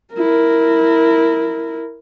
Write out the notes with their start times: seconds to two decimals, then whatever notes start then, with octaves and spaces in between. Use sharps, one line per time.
0.14 E4 A#4